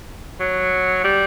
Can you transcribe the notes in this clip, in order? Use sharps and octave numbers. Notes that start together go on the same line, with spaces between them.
F#3
G3